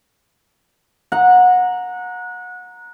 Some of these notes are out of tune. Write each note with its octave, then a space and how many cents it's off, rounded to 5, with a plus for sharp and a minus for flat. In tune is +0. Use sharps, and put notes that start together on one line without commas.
F#5 -25 A#5 +0